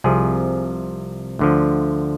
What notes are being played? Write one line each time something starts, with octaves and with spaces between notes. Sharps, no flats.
C2 C3 F3 G#4
D2 D3 F3